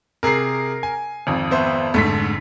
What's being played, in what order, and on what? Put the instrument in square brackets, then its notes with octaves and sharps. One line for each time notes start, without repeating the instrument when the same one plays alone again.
[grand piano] C3 G#4 [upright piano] A#4 C7
[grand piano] G#5
[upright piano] G#1 F2
[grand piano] B3 C5 E5
[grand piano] F1 G#2 D3 [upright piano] A3 B6